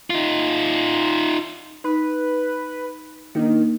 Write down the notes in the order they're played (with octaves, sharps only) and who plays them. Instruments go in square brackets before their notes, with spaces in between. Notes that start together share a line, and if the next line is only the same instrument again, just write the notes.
[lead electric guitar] D#4 F4
[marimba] D#4 [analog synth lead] B4
[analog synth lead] D#3 [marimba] A#3 D4 D#4